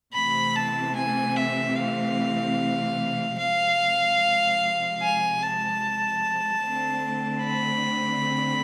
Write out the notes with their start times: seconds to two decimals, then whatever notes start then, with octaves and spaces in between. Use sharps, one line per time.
0.14 C3 E3 A3 C4 B5
0.56 A5
0.96 G#5
1.37 E5
1.77 F5
3.38 C3 F3 G#3 F5
5.02 G#5
5.42 A5
6.63 D3 A3 C4
7.44 B5